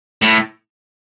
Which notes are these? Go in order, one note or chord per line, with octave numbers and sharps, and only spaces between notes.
A2